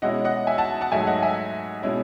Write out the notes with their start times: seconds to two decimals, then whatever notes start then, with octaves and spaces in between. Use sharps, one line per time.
0.02 B2 G#3 C#4 E4 D#5 F#5
0.25 D#5 F#5
0.47 E5 G#5
0.58 F#5 A5
0.81 F#5 A5
0.92 G#2 F#3 A3 E5 G#5
1.07 D#5 F#5
1.22 E5 G#5
1.83 B2 G#3 C#4 E4